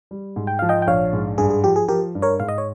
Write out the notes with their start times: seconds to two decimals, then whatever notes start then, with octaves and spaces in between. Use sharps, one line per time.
0.11 G3
0.36 G#2
0.47 G5
0.59 F3 F5
0.69 D#5 G5
0.82 G5
0.87 A#1 C#5 F5
1.13 G#2
1.38 G2 G#4
1.50 G#4
1.64 F3 G4
1.76 G#4
1.88 F3 G4 A#4
2.15 G2
2.22 A#4 C#5
2.40 G#2 F5
2.49 D#5
2.58 C#5